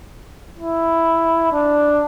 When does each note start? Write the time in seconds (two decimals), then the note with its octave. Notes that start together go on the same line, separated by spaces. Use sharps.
0.58 E4
1.52 D4